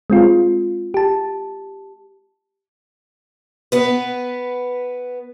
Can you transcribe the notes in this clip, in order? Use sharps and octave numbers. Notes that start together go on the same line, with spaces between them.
G#3 C4 F4
G4 A5
B3 B4